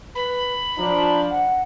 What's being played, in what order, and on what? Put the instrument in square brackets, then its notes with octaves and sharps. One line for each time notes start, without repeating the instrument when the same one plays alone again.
[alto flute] B4 [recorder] B5
[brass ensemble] F3 D4 [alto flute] A#5
[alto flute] F#5